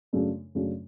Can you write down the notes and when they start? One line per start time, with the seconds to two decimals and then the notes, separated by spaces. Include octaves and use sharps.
0.13 F#2 C#3 F#3 A3 D4
0.55 F#2 C#3 F#3 A3 D4